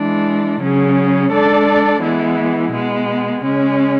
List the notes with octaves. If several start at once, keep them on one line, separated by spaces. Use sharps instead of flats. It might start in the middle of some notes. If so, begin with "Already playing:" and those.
Already playing: E3 G#3 D4
C#3 F#3 C#4 G#4
G#3 D4 A4 D5
E3 G#3 B3 E4
B2 G#3 B3
C#3 G#3 C#4